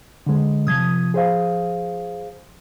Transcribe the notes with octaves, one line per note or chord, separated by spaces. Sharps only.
D3 G#3
C3 F3 D#6 G#6
G#4 C5 F5